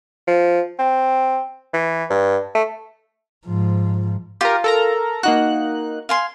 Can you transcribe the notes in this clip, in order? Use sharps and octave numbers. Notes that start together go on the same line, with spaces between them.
F3
C4
E3
G2
A3
G#2 F3
F4 G4 A#4
A4 A#4 A#5
A#3 D#4 F#4 F#6
F5 G#5 C6